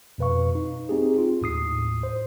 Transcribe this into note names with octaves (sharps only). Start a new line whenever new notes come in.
F2 B2 B4 F5 C#6
D#4
C4 D#4 G4 G#4
F4
D#2 A2 D#6 C7
C5